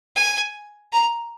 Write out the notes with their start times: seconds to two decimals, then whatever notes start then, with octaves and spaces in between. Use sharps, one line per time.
0.16 G#5
0.93 A#5